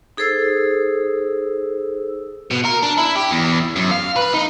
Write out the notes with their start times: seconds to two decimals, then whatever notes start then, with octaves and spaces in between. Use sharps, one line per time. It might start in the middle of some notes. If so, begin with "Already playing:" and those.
0.17 D#4 G#4 A4 C5 E6
2.51 B2
2.65 A#4
2.83 D4
2.98 E4
3.16 G4
3.31 E2
3.76 F#2
3.91 F5
4.16 B4
4.34 D#4